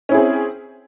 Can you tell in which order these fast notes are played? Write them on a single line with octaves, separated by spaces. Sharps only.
C#4 E4 G#4 C4